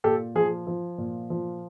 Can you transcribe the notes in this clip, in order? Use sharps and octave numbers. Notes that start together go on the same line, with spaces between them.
A#2 G4 A4
F3 G#4
F3
A#2
F3